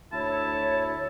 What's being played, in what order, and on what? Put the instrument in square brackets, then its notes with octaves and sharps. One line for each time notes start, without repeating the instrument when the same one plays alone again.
[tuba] D2 [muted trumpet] E4 [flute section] C#5 [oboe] A5